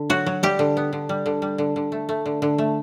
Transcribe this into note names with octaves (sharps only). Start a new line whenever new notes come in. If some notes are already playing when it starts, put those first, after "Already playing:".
Already playing: D3
F#3 F#4
F#3
G3 G4
D3
B3
D3
G3
D3
G3
D3
D3
A3
A3
D3
D3
A3